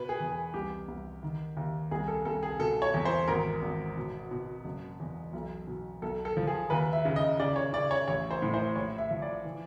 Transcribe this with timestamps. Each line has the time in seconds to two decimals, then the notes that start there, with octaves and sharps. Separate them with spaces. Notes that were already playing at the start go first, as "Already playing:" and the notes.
Already playing: B2 B4
0.09 G#4
0.20 E2
0.31 G#4
0.54 C2 G4
0.88 C2
1.23 D#3
1.57 D#2
1.91 C2 G#4
2.08 A4
2.25 C2 A4
2.43 G#4
2.59 B2 A4
2.82 C#5
2.94 E2
3.05 C5
3.28 G#1 A#4
3.62 G#1
3.97 B2
4.31 B2
4.64 F#1
5.00 E2
5.33 B1
5.67 B2
6.02 B1 A4
6.25 A4
6.37 F3
6.47 G#4
6.70 D#2 B4
6.93 E5
7.05 C#3
7.16 D#5
7.39 C#3 D5
7.56 C#5
7.73 C#3 D5
7.91 C#5
8.08 A1 C#5
8.31 C5
8.42 A2
8.54 C5
8.75 A#1 C#5
8.98 E5
9.11 F3
9.22 D5
9.45 E3